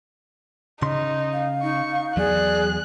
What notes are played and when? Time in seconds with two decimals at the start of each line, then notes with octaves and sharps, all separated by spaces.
0.82 C#3 D#4 C6
1.33 F5
1.63 D#4 C#6
2.17 E2 F#3 G#4 D5 F#6